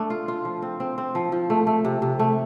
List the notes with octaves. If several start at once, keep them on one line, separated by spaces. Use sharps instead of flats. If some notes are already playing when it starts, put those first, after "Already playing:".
Already playing: A3 D4
F4
F4
F3
C4
C4
C4
F3
F3
A3
A3
C3
C3
A3